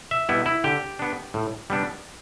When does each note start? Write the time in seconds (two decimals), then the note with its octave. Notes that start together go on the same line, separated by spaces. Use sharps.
0.11 E5
0.29 B2 G3 B3 E4
0.46 E4
0.64 D3 G4
0.99 B3 D4
1.34 A2
1.70 G3 B3 D4